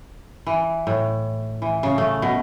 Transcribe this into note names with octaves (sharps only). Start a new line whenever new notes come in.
E3
A2
E3
C#3
A3
B2